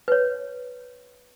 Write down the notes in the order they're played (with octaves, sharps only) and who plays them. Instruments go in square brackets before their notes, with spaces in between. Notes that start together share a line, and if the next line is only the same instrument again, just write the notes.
[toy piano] B4 C#5